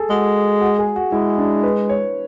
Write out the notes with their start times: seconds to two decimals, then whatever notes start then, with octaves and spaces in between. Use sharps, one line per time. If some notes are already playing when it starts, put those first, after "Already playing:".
Already playing: G#4 A4
0.10 G#3 F#4
0.61 F#4
0.79 G#4
0.96 F#4
1.12 G#3 E4
1.38 D4
1.63 B4
1.89 C#5